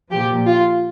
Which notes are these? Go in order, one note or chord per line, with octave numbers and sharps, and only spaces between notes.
A#2 F3 G4
F4